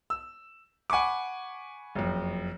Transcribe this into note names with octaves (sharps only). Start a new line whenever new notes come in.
E6
F#5 G#5 B5 C#6 D6
F#1 F2